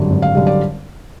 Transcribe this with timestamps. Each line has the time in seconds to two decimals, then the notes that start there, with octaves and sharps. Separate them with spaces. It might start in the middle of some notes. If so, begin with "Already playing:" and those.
Already playing: G#1 F#2 D3 G3
0.10 G#1
0.22 F5
0.35 F#2 D3 G3
0.47 D5